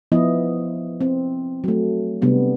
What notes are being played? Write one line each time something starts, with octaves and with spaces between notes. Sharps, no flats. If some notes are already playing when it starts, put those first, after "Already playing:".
F3 B3 E4 D#5
C4
F#3 A3
C3 G3 B3 D4